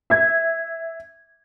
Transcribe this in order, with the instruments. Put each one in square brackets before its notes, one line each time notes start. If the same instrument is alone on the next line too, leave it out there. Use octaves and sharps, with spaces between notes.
[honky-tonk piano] E5 G#6